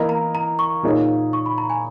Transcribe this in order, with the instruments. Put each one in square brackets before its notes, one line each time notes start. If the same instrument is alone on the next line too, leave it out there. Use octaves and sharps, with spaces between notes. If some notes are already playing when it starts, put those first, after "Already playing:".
Already playing: [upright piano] E3 A#3 E4 A#4 D#5
[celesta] A#5
A#5
C#6
[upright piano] A#2 A#3 D#4 G#4 C#5
[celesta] C#6
B5
A#5
G#5